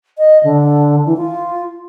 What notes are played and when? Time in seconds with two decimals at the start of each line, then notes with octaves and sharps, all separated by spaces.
0.18 D#5
0.44 D3
1.06 E3
1.17 F4